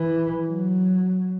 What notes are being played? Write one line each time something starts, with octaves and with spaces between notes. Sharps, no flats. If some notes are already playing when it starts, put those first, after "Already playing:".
Already playing: E3
F#3